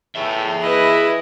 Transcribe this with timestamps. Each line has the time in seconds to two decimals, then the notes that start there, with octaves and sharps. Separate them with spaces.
0.16 A2 G#4 E5
0.62 E4 B4 D#5